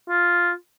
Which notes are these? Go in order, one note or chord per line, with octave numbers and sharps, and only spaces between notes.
F4